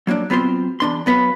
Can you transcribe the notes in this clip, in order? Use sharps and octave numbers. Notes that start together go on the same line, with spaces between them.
F#3 A#3 C#4 D4
F#3 B3 C4 F4 C5 C6
E2 D4 C6
F#3 B3 B4 F5 F#5